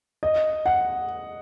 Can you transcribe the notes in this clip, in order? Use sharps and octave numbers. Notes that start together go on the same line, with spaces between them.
D#5
F#5